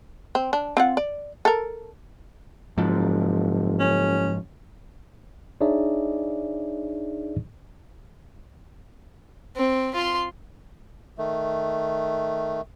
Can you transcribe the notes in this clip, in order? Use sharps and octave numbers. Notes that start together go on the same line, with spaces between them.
C4
D4
C4 F4 F#5
D5
A4 A#4
F#1 G#2 F3
C#4
D4 D#4 G#4 C#5 D5 E5
C4
F4 C6
D#3 A3